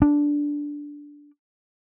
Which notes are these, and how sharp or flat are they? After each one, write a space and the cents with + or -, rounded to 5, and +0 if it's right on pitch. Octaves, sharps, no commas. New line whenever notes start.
D4 -5